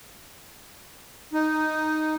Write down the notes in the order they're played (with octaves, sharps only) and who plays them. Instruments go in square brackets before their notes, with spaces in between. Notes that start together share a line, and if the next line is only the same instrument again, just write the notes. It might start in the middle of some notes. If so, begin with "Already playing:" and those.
[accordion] D#4